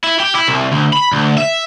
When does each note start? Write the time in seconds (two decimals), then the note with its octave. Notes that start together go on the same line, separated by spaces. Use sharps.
0.04 E4
0.20 G4
0.35 E4
0.48 C2
0.72 D2
0.93 B5
1.12 D2
1.38 E5